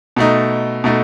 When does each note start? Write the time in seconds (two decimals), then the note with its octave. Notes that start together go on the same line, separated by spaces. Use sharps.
0.16 B2 A3 D#4
0.84 B2 A3 D#4